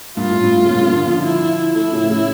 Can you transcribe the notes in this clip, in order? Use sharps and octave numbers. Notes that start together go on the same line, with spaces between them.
G2 A#2 F4
A2
G2
A2
C#3
G2 A#2
A#2 D3
D3 F3
E4
F3 A3 E4
A2 C#3
A2 C#3